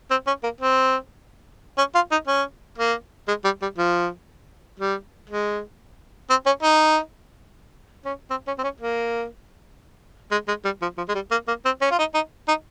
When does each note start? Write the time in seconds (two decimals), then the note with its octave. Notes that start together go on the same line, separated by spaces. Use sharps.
0.11 C4
0.27 C#4
0.43 A#3
0.61 C4
1.78 C#4
1.95 F4
2.11 D#4
2.27 C#4
2.78 A#3
3.28 G#3
3.44 G3
3.62 G3
3.78 F3
4.79 G3
5.30 G#3
6.30 C4
6.46 C#4
6.62 D#4
8.05 C#4
8.30 C4
8.47 C#4
8.58 C4
8.63 C#4
8.80 A#3
10.31 G#3
10.48 G#3
10.65 G3
10.82 F3
10.97 F3
11.08 G#3
11.15 G3
11.31 A#3
11.48 A#3
11.65 C4
11.81 C#4
11.91 F4
11.99 D#4
12.14 D#4
12.48 D#4